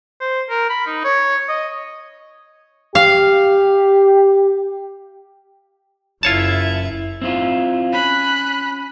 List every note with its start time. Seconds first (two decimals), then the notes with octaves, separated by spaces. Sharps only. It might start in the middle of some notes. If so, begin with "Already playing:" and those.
0.20 C5
0.50 A#4
0.70 B5
0.87 D#4
1.04 C#5
1.49 D#5
2.95 G4 F5
6.23 F#1 E4 F4 C#5 E5 A5
7.22 C4 E4 F4
7.93 C#4 B5 F#6